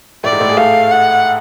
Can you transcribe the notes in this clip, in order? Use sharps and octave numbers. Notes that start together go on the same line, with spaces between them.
A2 A3 D5
G#2 G#3
A2 A3
G#3 G#4
A3 A4 F5
F#5